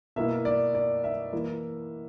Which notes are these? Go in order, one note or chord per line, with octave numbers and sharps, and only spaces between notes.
B2 A#3 E4 E5
D5
D5
E5
E3 A#3 E4